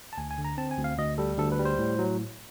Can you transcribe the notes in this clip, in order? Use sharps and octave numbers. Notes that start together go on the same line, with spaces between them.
A5
D2 G#5
G#5
D3
A#5
C4 A5
G#5
D2
F5
D2 D#5
G3 A4
D2 A4
B4
G3
C5
A2
F#3